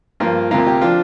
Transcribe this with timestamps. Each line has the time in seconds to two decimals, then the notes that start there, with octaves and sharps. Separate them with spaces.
0.20 G2 F3 A#3 F4 A#4
0.51 D2 C3 A#3 F4 A#4
0.67 G4
0.81 F3 D4 F4